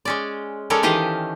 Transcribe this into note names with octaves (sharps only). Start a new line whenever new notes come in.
G#3 C#4 D5
G#3 C#4 A4 A#4 C#5 D5
D#3 E3 G4 D#5 F5